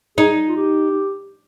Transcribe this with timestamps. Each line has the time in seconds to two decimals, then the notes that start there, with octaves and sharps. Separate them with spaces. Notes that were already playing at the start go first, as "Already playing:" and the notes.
0.18 D#4 G#4
0.49 F4
0.56 G4